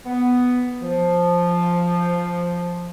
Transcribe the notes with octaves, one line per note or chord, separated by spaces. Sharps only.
B3
F3